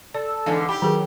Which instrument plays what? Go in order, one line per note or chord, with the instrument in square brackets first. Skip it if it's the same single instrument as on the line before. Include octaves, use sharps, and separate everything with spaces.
[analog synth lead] A4 [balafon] D5
[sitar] E2 G#2 D3 [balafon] F5 G#5
[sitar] G4 [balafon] B5
[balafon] D#3 G#4 A#4 [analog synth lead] F#3